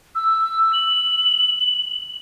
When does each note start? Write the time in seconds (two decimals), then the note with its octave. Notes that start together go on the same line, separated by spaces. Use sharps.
0.15 E6
0.73 F#7